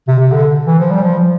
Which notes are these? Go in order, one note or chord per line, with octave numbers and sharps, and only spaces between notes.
C3
C3
D3
E3
F3
G3
F3